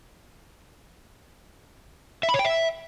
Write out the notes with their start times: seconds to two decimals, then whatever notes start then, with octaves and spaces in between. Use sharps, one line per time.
2.23 E5
2.29 B5
2.34 C#5
2.39 G5
2.45 E5